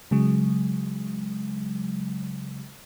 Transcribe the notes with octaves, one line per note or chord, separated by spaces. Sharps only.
C#3 F#3 G#3